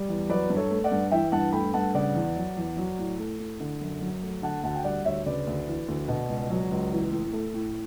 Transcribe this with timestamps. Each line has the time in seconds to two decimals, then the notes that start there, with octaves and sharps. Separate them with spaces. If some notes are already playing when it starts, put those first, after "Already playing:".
Already playing: G3
0.09 E2
0.29 F#3 B4 D5
0.50 G2
0.56 A4 C#5
0.71 A3
0.84 D5 F#5
0.92 G2
1.11 E3 E5 G5
1.32 G2 F#5 A5
1.53 A3 G5 B5
1.74 G2 F#5 A5
1.95 C#3 D5 F#5
2.15 E2
2.36 F#3
2.57 E2
2.77 F#3
2.98 A2
3.19 A3
3.39 A2
3.60 D3
3.81 F#2
4.02 F#3
4.22 A3
4.42 D3 F#5 A5
4.63 D2 F#5 A5
4.75 G5
4.84 G3 D5 F#5
5.05 D2 C#5 E5
5.26 C#3 B4 D5
5.47 D2
5.67 E3
5.88 D2
6.08 B2
6.29 C#2
6.50 F#3
6.71 C#2
6.92 E3
7.12 A2
7.33 A3
7.54 A2